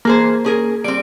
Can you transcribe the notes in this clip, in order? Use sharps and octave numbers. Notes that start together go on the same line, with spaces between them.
E3 A#3 G#4 C5
C#4 G#4 A#4
G3 C4 D7